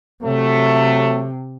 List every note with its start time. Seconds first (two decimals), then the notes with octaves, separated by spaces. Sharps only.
0.23 C3 F#3 A3